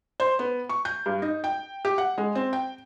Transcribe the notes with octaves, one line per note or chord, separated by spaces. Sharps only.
C5
B3
C#6
G6
G2
D#4
G5
G4
F#5
G#3
C4
G5